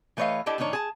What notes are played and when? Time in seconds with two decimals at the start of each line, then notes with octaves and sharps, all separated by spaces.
0.17 E3 A3 B4 C#5 D#5 F5
0.46 D4 E4 G4 A4 D#5 A5
0.58 A2 D#3 D4 D#4 C#5
0.73 G#4 A5